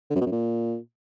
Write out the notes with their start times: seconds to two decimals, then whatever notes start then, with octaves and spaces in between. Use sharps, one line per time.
0.10 D3
0.16 F#2
0.21 B2
0.26 F#2
0.32 A#2